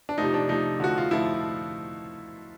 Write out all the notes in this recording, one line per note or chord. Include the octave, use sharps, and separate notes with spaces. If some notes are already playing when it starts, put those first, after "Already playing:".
D4
C3 F3 A3 D#4
D4
C3 F3 A3 D#4
D3 F3 A3 F#4
F4
D3 F3 A3 E4